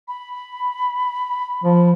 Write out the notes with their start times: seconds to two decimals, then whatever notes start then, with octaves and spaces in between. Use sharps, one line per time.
0.08 B5
1.64 F3